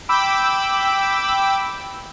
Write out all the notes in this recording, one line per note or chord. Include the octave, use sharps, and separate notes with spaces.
G5 B5 D6 E6